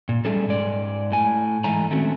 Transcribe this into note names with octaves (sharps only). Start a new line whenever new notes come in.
A#2
G3 A3 C#4 G#4 A4
G#2 G#3 D5
A2 G#5
G#2 E3 G#3 A3 G#5 A#5
D#3 A3 C4 C#4 F#4